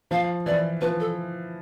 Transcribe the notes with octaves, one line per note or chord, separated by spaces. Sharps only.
F3 F5
E3 D5
F3 B4
A4